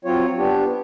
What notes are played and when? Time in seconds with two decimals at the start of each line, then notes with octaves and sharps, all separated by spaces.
0.05 F#3 C4 F4 C#5
0.37 B3 D4 G4